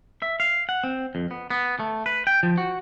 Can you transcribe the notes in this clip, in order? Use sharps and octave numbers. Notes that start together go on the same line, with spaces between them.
E5
F5
F#5
C4
F2
B3
B3
A3
B4
G5
F3
F#4